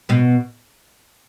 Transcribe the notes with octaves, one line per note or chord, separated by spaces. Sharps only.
B2 B3